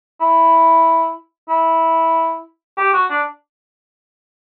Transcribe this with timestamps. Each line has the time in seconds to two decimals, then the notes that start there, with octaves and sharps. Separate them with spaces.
0.21 E4
1.49 E4
2.77 G4
2.93 F#4
3.10 D4